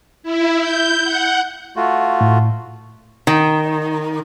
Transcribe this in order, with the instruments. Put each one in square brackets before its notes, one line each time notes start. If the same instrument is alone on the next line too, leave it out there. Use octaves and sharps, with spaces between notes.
[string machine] E4
G6
F#5
[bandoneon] A3 F4 F#4
[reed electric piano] A2
[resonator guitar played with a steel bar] D#3